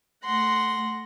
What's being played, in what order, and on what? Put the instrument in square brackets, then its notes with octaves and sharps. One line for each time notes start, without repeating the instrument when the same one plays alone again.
[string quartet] A3 F#5 C6 A#6